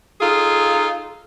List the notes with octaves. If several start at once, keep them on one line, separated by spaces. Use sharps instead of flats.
D#4 F4 G#4 A4